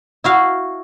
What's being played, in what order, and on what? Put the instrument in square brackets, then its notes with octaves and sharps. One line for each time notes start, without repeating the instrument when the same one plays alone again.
[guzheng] E4 F#4 F5